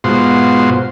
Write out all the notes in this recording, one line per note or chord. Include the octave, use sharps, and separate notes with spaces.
G#2 B2 F4 F#4 C5 C6